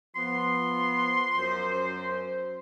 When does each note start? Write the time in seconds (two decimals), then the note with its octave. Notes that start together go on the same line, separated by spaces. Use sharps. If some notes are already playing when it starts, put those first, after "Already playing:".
0.16 F3 B3 C6
1.38 F#2 C5